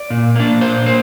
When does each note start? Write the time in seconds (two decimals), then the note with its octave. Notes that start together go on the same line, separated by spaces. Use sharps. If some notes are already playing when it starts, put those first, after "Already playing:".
Already playing: D5
0.10 A#2
0.36 A#3 D4
0.61 A#2 C5
0.86 A#3 C5